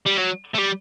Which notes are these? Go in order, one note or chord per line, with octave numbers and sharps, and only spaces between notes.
G3
F#3
A3
G3